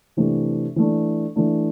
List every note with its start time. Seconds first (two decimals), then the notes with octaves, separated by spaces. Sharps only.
0.17 C3 E3 A3 D4
0.76 E3 A3 D4
1.36 E3 A3 D4